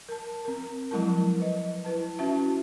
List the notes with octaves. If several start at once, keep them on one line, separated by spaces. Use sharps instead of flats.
A#4 A5
C4 A#4
F3 F#3 G#3 E4 A#4 A5
B4 D#5
E4 B4 A5
C#4 E4 F#4 E5 A5